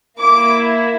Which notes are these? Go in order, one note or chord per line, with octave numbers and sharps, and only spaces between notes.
A#3 E4 D6